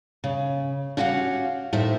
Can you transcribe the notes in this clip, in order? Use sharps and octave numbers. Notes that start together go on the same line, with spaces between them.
C#3
C#4 E4 F#4 G4 F5 F#5
A2 D#3 A3 C5 E5